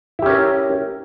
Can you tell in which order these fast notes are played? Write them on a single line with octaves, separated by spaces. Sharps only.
E4 G4 C#4 A#4